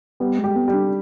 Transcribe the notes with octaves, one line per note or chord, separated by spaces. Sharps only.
G3 B3
G#3
G4
B3
G3
D4